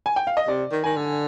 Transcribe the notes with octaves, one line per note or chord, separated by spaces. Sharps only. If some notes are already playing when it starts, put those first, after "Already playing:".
G#5
G5
F5
D#5
C3 D5
D#3
D#3 G#5
D3